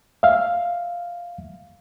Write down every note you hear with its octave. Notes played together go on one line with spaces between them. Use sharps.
E5 F5